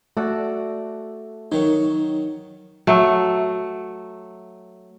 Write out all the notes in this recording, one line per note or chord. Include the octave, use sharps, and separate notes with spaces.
A3 F#4 A4 D5
D#3 F#3 D#4 C#5
F#3 A3